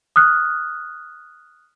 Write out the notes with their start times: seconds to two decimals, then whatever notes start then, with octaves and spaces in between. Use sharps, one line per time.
0.16 D#6 F6 F#6